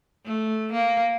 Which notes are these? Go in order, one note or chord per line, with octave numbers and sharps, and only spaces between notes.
A3
A#3